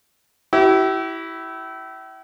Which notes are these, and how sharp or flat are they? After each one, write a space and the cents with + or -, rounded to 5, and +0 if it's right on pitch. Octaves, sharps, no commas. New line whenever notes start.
E4 -5 G4 -40